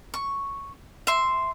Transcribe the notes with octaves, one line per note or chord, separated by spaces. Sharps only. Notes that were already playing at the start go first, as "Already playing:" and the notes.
C#6
E5 C6